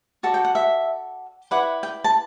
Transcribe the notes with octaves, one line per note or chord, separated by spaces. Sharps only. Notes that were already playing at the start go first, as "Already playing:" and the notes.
F#4 A4 D5 A5
G5
F#5
E5
E4 B4 D5 F#5
G5
A5